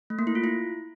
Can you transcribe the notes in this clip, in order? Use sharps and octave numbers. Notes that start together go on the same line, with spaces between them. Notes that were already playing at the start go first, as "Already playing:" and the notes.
A3
A#3
E4
F4
E4